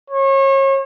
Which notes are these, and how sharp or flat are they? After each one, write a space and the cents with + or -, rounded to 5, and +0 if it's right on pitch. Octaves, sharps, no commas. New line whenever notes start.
C#5 -35